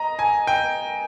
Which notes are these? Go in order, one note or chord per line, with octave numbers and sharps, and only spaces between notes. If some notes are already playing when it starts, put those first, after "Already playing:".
Already playing: D#5 A#5
G#5
G5